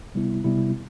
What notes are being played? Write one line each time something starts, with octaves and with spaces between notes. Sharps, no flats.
C3 G3 B3 E4
C3 G3 B3 E4